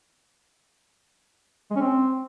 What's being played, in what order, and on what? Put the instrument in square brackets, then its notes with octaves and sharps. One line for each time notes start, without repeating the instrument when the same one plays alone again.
[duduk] G#3
C#4
C4